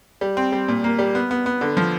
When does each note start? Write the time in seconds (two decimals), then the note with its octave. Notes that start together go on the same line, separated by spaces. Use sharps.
0.21 G3
0.37 C4
0.52 G3
0.68 A#2
0.84 A#3
0.99 G3
1.15 B3
1.31 B3
1.46 B3
1.61 D3
1.77 F3